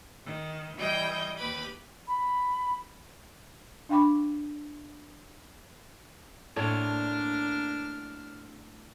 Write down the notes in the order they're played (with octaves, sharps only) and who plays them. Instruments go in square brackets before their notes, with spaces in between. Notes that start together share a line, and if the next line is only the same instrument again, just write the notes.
[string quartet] D#3
E3 G3 D#5 G5 G6 G#6
D#2 G4 B4 B5 D6
[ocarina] B5
[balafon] D4 F5 G5 B5 C#6 D6
[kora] A2 [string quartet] A#3 D4 F6 [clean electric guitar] C4 C#5 D5 [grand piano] A4